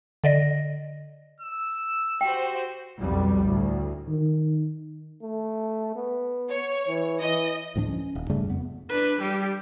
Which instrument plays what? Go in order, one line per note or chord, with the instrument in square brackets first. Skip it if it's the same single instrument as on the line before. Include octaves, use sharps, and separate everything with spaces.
[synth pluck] D3 D5 D#5 A#6
[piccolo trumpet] E6
[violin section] F#4 G4 C5 [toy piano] G5
[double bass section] B1 F2 G3
D2 A2
[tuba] D#3
[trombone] A3
B3
[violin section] C#5
[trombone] E3
[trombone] E3 [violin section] D#5
[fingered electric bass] D2 A2 F3 D4
C#4
D#1
G2 C#3 G3 A3
F2 B3
[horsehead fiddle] D4 B4
G3 G4